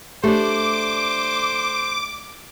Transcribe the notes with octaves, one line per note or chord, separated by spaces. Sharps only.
A3 D4 G4 C5 D6